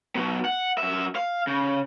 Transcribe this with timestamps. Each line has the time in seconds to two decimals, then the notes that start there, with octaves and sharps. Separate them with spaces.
0.15 F#3 B3
0.45 F#5
0.78 F#2 E5
1.16 F5
1.47 C#3